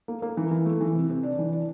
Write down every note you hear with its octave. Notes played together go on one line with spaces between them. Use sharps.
A#3
A#3
E3
E3
A3
E3
C3
C3
D4
E3
D4